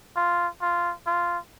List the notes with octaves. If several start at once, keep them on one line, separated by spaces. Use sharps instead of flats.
F4
F4
F4